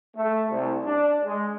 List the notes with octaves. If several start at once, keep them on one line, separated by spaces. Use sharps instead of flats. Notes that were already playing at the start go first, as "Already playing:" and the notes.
A3
C2
D4
G#3